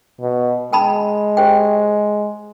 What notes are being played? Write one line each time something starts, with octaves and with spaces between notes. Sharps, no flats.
B2
G#3 G5 A5 B5
G4 C5 G5